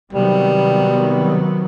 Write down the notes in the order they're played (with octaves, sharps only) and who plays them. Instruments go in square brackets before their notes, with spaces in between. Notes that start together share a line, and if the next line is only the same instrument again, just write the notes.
[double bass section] C3 D#3 F#3 B3 [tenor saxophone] G3